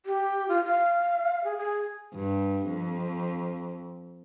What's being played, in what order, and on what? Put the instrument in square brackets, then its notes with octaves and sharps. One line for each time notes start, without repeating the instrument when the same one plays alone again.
[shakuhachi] G4
F4
F5
G#4
G#4
[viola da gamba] G2
F2